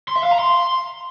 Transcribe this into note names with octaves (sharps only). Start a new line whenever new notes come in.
C6
E5
F5
A#5
C6